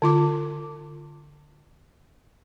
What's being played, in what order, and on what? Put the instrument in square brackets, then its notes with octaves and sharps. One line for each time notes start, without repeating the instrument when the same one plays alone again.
[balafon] D3 F4 D6